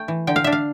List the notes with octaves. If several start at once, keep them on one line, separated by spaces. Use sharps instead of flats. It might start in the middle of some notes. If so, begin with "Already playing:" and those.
Already playing: A3 G5
E3
D3 G5
F5
D4 E5
F5